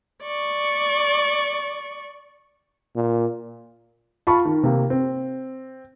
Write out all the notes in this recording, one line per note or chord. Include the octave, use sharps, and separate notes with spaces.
D5 C#6
A#2
F4 F5 A5 B5 C#6
D#3
C3 A#3
C4